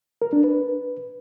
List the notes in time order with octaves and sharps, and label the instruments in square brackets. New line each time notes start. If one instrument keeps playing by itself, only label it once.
[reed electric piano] A#4
D4
B4